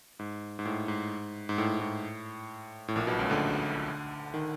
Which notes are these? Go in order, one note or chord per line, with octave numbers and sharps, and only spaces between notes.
G#2
G#2
A2
G#2
G#2
A2
A2
A2
A#1 A#2
B1 B2
C#2 C#3
D2 D3
D#3